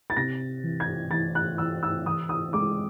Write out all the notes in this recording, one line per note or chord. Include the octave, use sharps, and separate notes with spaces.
A6
C3 A#6
E3
G#6
E3 A6
F#6
E3 E6
E6
E3 D#6
D#6
G#3 D6